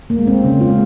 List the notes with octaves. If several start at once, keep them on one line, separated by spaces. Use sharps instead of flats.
A#3
G#3
C4
C#3 C#4
F4
G#3